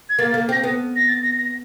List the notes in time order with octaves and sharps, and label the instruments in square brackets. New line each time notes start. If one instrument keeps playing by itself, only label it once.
[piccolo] G#6
[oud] A#3 [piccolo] A6
[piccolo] A6
[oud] A#3
[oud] C4 [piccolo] A#6
[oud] B3
[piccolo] A#6
A6
A#6
A#6